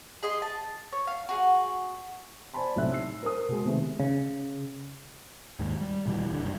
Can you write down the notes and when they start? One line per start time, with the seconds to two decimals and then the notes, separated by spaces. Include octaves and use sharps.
0.23 G#4 D#5 C6
0.42 A5
0.93 C#5
1.07 F5
1.29 F#4 G#4
2.54 C5 D5 G#5 A5 B5 C6
2.76 B1 A2 C3 C5 E5 F#6
2.92 E6 C7
3.23 A#4 C5 D#6
3.48 B2 G#3
3.65 C3 D#3 G#3 A3 B3
4.00 C#3
5.59 D#2 G#2
5.81 G3
6.06 D#1 B2 E3 G3
6.29 D#1 D3
6.43 F#1 G2